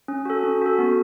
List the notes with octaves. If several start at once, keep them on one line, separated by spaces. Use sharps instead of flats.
C#4
F#4 A4
C#4
F#4 A4
B3